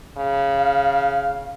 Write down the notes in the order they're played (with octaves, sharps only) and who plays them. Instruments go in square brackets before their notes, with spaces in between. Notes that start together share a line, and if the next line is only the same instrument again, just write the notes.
[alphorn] C#3
[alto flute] F5